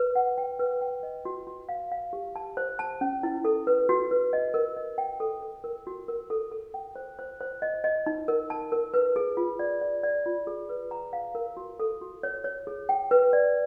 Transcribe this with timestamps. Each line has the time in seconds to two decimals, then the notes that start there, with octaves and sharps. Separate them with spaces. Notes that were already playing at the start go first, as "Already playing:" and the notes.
Already playing: B4
0.15 F#5
0.38 G5
0.60 B4
0.82 G5
1.03 D#5
1.25 F#4
1.47 F#4
1.69 F5
1.92 F5
2.13 G4
2.36 A5
2.57 C5
2.79 A5
3.01 C#4
3.23 E4
3.45 A4
3.67 B4
3.89 F#4
4.11 B4
4.33 D#5
4.54 A#4
4.77 D#5
4.98 G5
5.20 A4
5.42 A4
5.64 A#4
5.87 F#4
6.08 A#4
6.30 A4
6.52 A4
6.74 G5
6.96 C5
7.19 C5
7.41 C5
7.62 D#5
7.84 D#5
8.06 D#4
8.28 A#4
8.50 A5
8.72 A#4
8.94 B4
9.16 G#4
9.37 F4
9.59 D5
9.81 D5
10.03 D5
10.26 F4
10.47 G#4
10.69 B4
10.91 A#5
11.13 F5
11.35 A#4
11.57 F#4
11.80 A4
12.02 F#4
12.23 C#5
12.44 C#5
12.67 G#4
12.89 G5
13.11 B4
13.33 D5